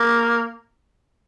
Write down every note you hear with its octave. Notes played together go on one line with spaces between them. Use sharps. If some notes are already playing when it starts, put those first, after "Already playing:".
Already playing: A#3